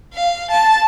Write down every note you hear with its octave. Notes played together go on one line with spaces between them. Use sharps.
F5
A5